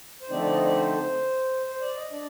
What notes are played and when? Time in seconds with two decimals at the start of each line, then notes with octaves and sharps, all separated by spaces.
0.22 C5
0.30 D3 F3 A3 C4 D#4 D5
0.42 D5
0.53 D#5
0.64 D5
0.76 C5
1.66 C5
1.81 D5
1.97 D#5
2.11 D4 D5